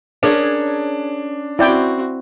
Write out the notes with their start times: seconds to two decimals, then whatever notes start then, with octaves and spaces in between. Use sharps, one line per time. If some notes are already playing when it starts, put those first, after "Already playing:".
0.23 C#4 D4 G#4 A#4
1.59 C4 E4 F#4 D5 G5